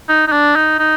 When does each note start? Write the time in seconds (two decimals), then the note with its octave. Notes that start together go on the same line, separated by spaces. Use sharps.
0.08 D#4
0.27 D#4
0.32 D4
0.55 D#4
0.79 D#4